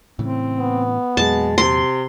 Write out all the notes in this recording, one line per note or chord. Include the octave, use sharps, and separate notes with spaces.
A2 C#3 E3 C4
B3
E2 A#2 F#3 G#3 A5
C3 C6